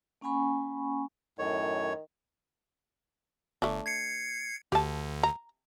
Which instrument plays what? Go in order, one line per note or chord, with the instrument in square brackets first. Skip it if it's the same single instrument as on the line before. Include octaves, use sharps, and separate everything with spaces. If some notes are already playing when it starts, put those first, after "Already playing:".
[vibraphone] A#3 C#4 F#5 G#5 B5 C#6
[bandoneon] F#2 C#5 [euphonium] A2 [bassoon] D#3
[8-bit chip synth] G1 [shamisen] A3 D4
[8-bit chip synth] G#6 C7 C#7
[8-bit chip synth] D2 D3 [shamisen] G4 A5
[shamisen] A#5